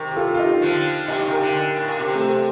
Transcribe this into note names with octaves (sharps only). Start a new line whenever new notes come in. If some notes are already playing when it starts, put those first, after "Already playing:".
Already playing: C3 D#3 G4 A#4
G4
F4 A4
F4
D#4 G4
D3 F3
A#2 D#4 G4
A2
C3
A#2 G4 A#4
D3
A2
A#2
C3 G4 A#4
A3 C4
A3